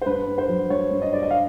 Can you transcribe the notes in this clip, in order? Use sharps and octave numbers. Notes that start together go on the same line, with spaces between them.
C5
G2 B4
G2
C5
F#3
G2 C#5
G2
D#5
G2 D5
D#5
F5